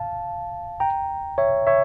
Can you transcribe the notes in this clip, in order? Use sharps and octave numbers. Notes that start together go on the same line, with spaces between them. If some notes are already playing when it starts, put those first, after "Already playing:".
Already playing: F5 A5
G5 A#5
C#5 E5
C#5 E5